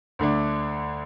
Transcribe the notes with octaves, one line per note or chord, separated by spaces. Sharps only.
D2 D3 A3 D4